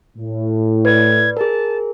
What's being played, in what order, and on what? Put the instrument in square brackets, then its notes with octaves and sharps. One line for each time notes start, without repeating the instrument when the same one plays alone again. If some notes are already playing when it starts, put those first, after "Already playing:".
[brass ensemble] A2
[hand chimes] B4 D5 [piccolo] G#6
[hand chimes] G#4 A#4 [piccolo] A5